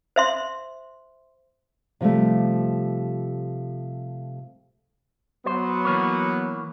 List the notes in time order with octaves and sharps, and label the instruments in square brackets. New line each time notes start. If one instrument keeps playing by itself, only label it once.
[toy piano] C5 E5 C6
[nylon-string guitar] C3 F3 G3 A3
[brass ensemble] F#3 B3 [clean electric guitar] C5
[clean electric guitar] E3 A#3 C#5